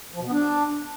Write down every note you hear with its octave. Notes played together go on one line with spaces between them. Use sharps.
F3
B2
B3
D4